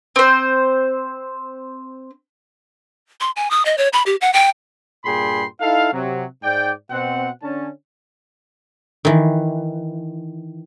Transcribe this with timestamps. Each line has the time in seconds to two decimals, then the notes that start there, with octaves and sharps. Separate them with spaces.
0.16 C4 C5
3.21 C6
3.36 G#5
3.51 D#6
3.65 D#5
3.78 C#5
3.93 B5
4.06 G4
4.21 F#5
4.33 G5
5.05 G2 A#2 G#4 G5 B5 C6
5.60 D#4 E4 A4 F5
5.92 C3 F#3
6.43 G#2 D5 G5
6.91 B2 C4 F#5
7.42 D3 C#4 A5
9.05 D#3 E3